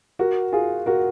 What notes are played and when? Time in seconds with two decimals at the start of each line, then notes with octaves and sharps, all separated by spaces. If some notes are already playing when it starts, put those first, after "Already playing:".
0.19 F#4 A#4
0.52 F4 G#4
0.86 F#4 A#4